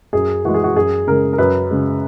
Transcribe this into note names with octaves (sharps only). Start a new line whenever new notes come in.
F#2 G#4
E3 G#3 F#4
G#4
F#4
F#2 G#4
C#3 G#3 A#4
A#4
F#2 B4
C#3 G#3